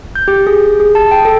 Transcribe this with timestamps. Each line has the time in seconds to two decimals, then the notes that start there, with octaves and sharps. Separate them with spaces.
0.15 G6
0.28 G4
0.47 G#4
0.80 G#4
0.95 A5
1.11 G5
1.25 A4